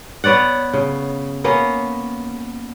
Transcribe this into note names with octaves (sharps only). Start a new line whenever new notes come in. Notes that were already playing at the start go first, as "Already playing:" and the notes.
B3 C#5 D5 F#5
C#3
A#3 B3 C#4